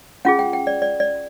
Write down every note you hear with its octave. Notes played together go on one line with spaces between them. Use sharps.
C#4 F4 G#4 F#5
G5
G5
D5
D5
D5